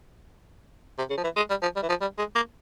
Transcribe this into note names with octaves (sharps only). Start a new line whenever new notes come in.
C3
C#3
F3
E3
G#3
G3
F3
G3
E3
F3
G3
G#3
A#3